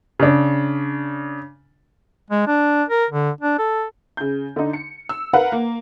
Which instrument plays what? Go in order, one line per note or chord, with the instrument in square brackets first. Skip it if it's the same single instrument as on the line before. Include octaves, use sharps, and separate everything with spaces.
[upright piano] C#3 D4
[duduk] G#3
D4
A#4
D3
D4
A4
[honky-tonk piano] C#3 G6
D3 D#4
C#7
E6
A#4 B4 F5 F#5
A#3